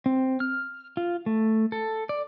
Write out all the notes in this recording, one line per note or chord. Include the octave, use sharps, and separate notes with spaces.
C4
F6
F4
A3
A4
D5